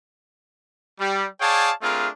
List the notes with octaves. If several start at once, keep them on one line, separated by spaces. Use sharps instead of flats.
G3
G#4 C#5 D5 F5 G5 A5
A3 C4 D4 F4 G#4 A#4